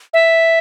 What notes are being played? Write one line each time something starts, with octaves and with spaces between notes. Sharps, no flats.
E5